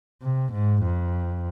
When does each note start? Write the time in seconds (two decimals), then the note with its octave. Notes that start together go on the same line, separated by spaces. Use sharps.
0.23 C3
0.53 G#2
0.83 F2